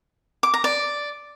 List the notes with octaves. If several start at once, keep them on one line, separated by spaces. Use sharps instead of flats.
D6
A#5
D5